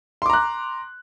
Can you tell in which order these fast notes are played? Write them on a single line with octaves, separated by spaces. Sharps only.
C6 D6 A#5 F#6